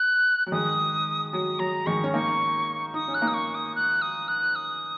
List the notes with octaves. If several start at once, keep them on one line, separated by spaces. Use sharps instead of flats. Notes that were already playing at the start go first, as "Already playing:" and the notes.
Already playing: F#6
F#3
D#3 G#3 D#6
F#3 D#6
F#3 A#5
D#3 G#3 C#6
C#4
A#3 D#4 C#6
D#4 D#6
C#4
F#6
A#3 D#4
D#6
C#6
D#6
F#6
D#6
F#6
D#6